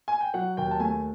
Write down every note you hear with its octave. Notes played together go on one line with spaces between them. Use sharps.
G#5
G5
F#3 F#5
D#2 G5
A5
A3 G#5